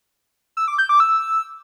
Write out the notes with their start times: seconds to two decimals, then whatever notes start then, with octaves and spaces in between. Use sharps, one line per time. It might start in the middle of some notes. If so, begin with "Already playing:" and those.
0.57 E6
0.68 D6
0.78 G6
0.89 D6
1.00 E6